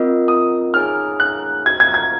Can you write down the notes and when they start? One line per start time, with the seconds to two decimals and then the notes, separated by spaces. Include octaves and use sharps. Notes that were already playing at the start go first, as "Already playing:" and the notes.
Already playing: C4 F4 A#4 D#5
0.28 D#6
0.74 D#4 G#4 C#5 G#5 F6
1.20 F#6
1.66 F#4 C5 D#5 G#6
1.80 G#6
1.94 G#6